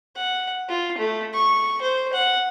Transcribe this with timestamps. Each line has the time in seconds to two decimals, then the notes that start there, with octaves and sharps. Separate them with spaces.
0.16 F#5
0.69 F4
0.98 A3
1.34 C#6
1.82 C5
2.13 F#5